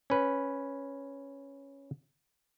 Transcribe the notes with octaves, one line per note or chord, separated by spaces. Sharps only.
C#4 B4